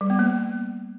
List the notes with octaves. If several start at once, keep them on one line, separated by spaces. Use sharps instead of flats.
G3
B3
A#3